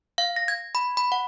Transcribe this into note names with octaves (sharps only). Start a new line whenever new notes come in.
F5
A#6
G#6
B5
B5
F#5